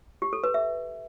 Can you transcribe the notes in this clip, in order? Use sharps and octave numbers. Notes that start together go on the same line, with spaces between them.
G4
A4
B4
E5